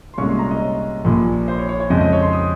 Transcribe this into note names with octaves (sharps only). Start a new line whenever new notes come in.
C6
C2 A#2 G#3 C#4 C#6
C6
A#5
D#5
C#5
A#1 A#2 F3
C5
C#5
C#5
C#5
F2 C#3 G#3 C4 D#5
D#5
C#5
C6
D#6